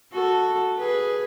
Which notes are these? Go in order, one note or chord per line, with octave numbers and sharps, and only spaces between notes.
F#4 A4
G#4 B4